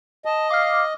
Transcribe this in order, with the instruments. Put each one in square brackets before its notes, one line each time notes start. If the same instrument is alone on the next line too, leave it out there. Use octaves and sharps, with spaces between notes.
[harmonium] D#5 [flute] A5
[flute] F5 [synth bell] D6 F6